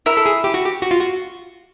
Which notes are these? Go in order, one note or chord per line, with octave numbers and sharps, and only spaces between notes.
E4 A#4
A4
G#4
G4
F#4
G4
F#4
F4
F#4